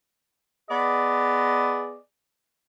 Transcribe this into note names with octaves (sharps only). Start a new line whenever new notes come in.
B3 G#4 D5 D#5